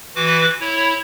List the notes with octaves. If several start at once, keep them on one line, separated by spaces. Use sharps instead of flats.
E3 F#4 B4 D6
E4 C#5